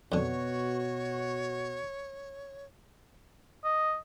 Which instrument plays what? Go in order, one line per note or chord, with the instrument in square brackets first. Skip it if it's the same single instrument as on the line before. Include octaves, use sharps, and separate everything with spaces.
[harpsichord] F2 D3 [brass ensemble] B2 F#4 [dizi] C#5
[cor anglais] D#5